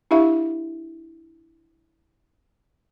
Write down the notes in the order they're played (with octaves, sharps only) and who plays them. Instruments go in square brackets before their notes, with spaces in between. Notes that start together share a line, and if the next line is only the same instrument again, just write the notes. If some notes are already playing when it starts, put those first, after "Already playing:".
[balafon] D4 E4 G4 E5 F5